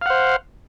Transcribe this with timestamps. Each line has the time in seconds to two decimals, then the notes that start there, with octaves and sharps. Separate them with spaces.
0.01 F5
0.06 F#5
0.10 C5